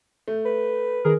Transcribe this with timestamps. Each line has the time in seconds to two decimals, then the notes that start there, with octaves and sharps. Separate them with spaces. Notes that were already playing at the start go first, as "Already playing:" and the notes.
0.28 A3
0.45 B4
1.04 D#3 G#4 A#4